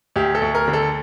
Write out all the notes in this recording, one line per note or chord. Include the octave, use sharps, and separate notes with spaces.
D2 G4
A4
D2
A#4
D3
A4